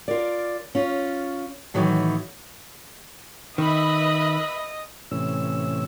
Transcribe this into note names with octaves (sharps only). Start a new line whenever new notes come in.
F4 A#4 D5
C#4 F4
A2 D#3 E3 F#3 A3
D#3 B4 D#5 E5 B5
A2 C3 E3 C#4 E6